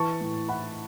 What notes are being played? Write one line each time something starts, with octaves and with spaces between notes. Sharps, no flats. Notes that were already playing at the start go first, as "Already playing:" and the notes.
Already playing: E3 A5 C#6
A2
E4 F#5 B5